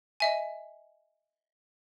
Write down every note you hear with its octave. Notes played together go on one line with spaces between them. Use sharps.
D#5 E5 G#5